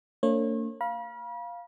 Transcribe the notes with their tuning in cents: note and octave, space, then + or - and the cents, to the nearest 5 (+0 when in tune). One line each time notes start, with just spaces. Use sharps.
A#3 -45 D4 -30 C#5 -35
F5 +0 B5 -40